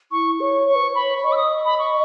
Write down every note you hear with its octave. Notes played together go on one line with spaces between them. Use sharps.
E4 C#6
C#5 C#6
C#5 C#6
B4
C#5
B5
C#5
D#5 C#6
E6
D#6
B5
C#6